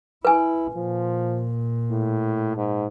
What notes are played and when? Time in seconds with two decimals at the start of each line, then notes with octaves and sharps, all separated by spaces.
0.25 E4 B4 G#5
0.76 A#2 F3
1.90 A2
2.57 G#2